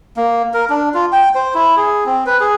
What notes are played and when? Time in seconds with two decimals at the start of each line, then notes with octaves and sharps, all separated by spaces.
0.17 A#3
0.54 A#4
0.70 D4
0.94 F4
1.12 G5
1.35 C5
1.54 E4
1.77 G#4
2.06 C4
2.26 B4
2.40 G#4